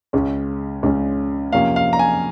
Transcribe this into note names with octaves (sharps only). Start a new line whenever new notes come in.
C#2 C#3 G#3 C#4
C#2 C#3 G#3 C#4
F2 C3 F3 A#3 C#4 F5
F5
A#5
G#5